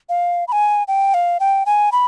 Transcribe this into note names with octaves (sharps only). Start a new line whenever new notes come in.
F5
B5
G#5
G5
F5
G5
G#5
B5